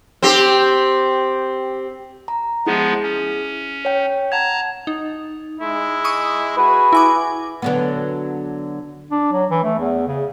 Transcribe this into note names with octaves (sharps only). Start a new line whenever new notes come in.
C4 G4
A#5
F3 G#3 B3 E4 G#4
C#4
C#5 G5
F#5 A5 A#5 G#6
D#4
G#3 E4
C#6 D#6
F#4 G#4 B4
E4 G#5 D6
D3 F#3 B3
D4
F#3
E3
A3
E2
C#3